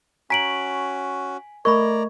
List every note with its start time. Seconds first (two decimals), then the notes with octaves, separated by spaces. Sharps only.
0.30 C#4 F#4 G#5 A#5 B6 D7 F#7
1.65 A3 A#4 D5 D#5 A#5 B5 C#6 G#6